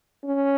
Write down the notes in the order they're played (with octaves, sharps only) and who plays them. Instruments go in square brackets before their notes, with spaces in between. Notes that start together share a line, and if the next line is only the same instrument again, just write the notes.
[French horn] C#4